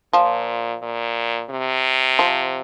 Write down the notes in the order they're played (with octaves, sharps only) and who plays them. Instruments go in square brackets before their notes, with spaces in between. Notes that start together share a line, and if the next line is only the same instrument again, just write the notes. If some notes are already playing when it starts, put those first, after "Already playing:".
[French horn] A#2 [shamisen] F3
[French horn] A#2
C3
[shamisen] F3